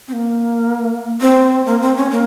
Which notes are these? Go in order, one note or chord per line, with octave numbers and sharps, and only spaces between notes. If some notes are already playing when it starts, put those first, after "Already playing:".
C4
A#3
C4
A#3
C4
C#4
A#3